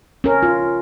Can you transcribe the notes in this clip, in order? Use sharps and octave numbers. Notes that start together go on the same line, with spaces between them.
C#4 A#4
F4